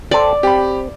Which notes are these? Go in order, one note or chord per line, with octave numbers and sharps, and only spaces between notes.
A4 C5 D5 G5
C4 G4 B5